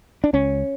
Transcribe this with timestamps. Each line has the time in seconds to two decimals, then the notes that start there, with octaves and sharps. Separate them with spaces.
0.24 D4
0.33 C#2 C#4